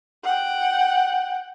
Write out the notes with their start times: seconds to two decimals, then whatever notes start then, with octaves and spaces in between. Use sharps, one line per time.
0.24 F#5 G5